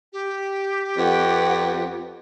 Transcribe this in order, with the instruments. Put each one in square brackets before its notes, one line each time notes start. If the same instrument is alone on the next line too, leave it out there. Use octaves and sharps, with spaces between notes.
[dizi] G4
[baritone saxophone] F2 [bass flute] B4 [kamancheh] F#5 G5